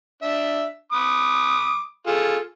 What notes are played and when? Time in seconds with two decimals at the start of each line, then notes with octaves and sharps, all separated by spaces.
0.22 D4 E5
0.92 B5 D6 D#6
2.07 F4 G#4 A4